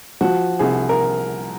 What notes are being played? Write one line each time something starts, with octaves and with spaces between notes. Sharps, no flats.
F3 F#4
C2 G#4
A#4